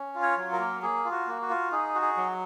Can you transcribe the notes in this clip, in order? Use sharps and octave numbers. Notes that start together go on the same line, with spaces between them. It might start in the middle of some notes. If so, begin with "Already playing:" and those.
Already playing: C#4
F4
C#5
F#3
A#4
A#3
A#3 G#4
F4
F#4
A#3
F#4
F4
D#4 G#4
F#4
G#4
F#3